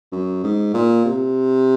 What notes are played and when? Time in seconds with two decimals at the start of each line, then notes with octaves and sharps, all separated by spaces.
0.12 F#2
0.44 G#2
0.74 A#2
1.05 C3